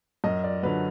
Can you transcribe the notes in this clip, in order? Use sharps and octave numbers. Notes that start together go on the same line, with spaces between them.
F#2 D#5
D5
D3 F#3 B4